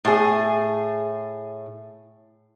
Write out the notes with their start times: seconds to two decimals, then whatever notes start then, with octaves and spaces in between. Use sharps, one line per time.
0.05 A2 G#4